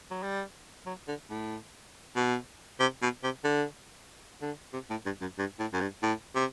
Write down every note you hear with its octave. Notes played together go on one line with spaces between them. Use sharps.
F#3
G3
F#3
D3
A2
B2
C3
B2
C3
D3
D3
C3
A2
G2
F#2
G2
A2
F#2
G2
A2
C3